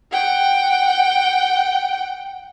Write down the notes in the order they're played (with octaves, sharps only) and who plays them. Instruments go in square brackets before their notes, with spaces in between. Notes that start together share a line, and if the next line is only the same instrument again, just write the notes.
[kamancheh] F#5 G5